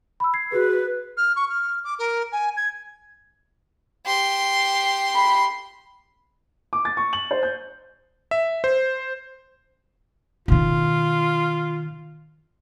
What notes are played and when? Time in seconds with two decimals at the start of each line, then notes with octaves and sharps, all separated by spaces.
0.20 B5 E6
0.34 G#6 C7
0.52 F#4 G#4 B4
1.17 F6
1.36 C#6
1.49 F6
1.84 D6
1.99 A#4
2.32 G#5
2.56 G#6
4.06 G4 C6
5.15 B5
6.73 D6
6.85 A6
6.97 C#6
7.13 F#7
7.31 C5
7.43 G6
8.31 E5
8.64 C5
10.48 B2 D#3 F4